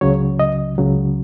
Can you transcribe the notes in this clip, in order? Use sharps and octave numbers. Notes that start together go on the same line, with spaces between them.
C#2 C#3 F#3 C#5
D#5
C#2 C#3 F#3